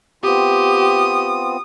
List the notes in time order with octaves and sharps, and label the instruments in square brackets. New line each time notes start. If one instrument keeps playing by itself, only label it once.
[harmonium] B3 C4 F4 [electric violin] G4 [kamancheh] D#6